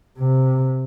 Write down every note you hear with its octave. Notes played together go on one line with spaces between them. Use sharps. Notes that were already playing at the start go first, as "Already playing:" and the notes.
C3